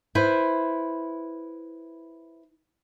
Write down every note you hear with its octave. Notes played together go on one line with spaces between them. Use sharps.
E4 B4 C5